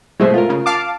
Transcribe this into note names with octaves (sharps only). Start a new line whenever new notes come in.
B2 G#3 A3 C5 E5
F4 A#4
C#3
F5 A5 D6